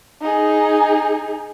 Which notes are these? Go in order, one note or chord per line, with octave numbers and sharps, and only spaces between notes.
D#4 G#4